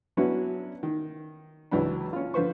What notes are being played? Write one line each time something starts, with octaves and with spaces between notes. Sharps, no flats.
F#3 B3 C#4 D4 E4 F#4
D#3
C#2 E3 F#3 D4 B5
C#4 F4
D3 F3 B4 C5 C#6